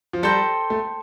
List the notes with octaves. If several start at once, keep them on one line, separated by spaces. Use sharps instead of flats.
F3
G3 A4 C5 G5 A#5
A3